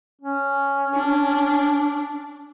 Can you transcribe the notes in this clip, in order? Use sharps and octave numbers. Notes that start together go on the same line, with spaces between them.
C#4
D4